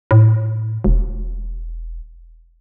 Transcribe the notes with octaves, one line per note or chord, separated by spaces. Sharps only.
A2
E1